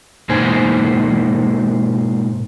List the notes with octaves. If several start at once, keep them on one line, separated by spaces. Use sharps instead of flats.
G#2 B2 A#3 D#4 C5 G#5